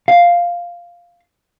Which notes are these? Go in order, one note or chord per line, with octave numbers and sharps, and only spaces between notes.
F5